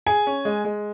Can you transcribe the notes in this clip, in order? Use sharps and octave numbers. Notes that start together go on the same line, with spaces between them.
G#4 G#5
C#4
G#3
G#3